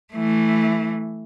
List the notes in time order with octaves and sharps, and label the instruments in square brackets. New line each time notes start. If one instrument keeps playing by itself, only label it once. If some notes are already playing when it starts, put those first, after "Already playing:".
[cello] E3 A3